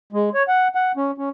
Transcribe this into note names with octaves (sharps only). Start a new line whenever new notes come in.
G#3
C#5
F#5
F#5
C#4
C#4